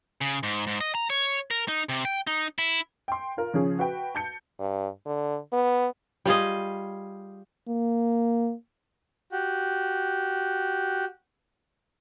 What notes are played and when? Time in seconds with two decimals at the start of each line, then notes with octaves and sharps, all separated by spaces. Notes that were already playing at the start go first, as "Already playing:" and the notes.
0.21 C#3
0.43 G#2
0.67 G#2
0.81 D#5
0.95 A#5
1.10 C#5
1.51 A#4
1.68 D#4
1.89 C3
2.05 G5
2.27 D#4
2.59 E4
3.08 G5 C6
3.37 F4 A#4
3.53 C#3 F3 C#4 G#4
3.79 F#4 B4 G5
4.15 A5 G6 C#7
4.59 G2
5.06 D3
5.53 B3
6.25 G3 F4 G#4 D#5
7.68 A#3
9.32 F#4 G4